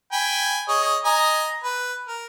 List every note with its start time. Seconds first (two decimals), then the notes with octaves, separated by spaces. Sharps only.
0.13 G5 G#5 B5
0.69 G#4 C#5 D#5
1.05 D#5 G#5 A#5
1.64 B4
2.08 A#4